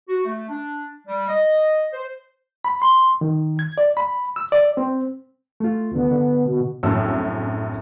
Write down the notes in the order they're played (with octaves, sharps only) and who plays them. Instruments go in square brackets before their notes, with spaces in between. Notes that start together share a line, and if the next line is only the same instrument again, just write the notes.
[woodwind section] F#4
A3
D4
G3
D#5
C5
[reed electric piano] B5
C6
D#3
G#6
D5
B5
E6
D5
C4
A3 F4
[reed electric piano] D2 D3 [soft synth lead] B3
[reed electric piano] D3
[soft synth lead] B2
[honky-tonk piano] A#1 F#2 A2 C3 E6